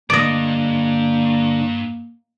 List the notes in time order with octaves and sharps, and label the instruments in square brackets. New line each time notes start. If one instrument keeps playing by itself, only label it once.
[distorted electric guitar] G2 [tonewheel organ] D3 [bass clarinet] A#3 [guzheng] D5 D#5